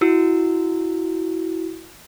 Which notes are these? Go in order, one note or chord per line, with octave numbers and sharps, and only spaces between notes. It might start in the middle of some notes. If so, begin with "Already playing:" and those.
E4 F#4 E6